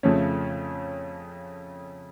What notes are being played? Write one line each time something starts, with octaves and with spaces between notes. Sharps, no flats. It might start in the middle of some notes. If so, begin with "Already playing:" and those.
F2 C#3 F3 A3 C#4